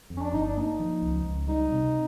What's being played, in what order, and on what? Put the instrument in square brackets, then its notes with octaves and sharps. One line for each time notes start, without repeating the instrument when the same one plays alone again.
[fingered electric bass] F2
[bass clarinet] C#4
D4
[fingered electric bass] G1 [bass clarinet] D#4
[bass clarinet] D4
[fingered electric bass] A#3 [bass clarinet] D#4
[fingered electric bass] F3
C#2
C#2
[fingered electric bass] G3 [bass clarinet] D#4
[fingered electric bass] C3